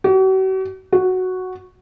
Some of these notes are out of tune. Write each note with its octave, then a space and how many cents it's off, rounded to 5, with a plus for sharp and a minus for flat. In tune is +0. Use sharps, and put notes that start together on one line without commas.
F#4 +45
F#4 +0